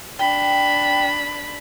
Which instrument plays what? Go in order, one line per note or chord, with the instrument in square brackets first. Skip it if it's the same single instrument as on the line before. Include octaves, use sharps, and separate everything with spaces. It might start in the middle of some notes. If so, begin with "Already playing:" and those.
[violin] D4 B5 [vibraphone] G5